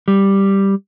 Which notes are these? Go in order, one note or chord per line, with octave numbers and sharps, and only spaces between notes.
G3